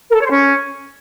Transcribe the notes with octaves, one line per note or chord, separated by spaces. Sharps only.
A#4
A4
C#5
C5
C#4